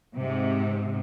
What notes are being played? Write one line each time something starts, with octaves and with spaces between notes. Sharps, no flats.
G#2 C3